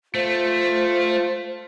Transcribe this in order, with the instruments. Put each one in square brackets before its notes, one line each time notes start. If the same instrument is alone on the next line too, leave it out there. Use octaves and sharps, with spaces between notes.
[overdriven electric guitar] A3 [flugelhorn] F4 [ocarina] C5